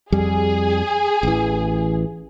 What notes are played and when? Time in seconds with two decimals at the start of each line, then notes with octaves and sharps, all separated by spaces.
0.12 F2 G3 G#4
1.23 A1 E3